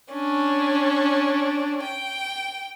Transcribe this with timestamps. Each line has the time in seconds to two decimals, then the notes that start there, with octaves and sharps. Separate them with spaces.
0.11 C#4 D4
1.83 G5